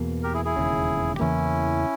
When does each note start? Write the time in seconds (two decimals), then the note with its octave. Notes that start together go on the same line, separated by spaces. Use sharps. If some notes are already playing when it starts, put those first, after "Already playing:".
Already playing: E2 B2 A#3
0.23 G4 A#4
0.34 E4 G#4
0.45 E4 G#4
0.56 E1 D#2 C#3
1.15 G4
1.19 E2 C#3 E3 A#3 C#4 E4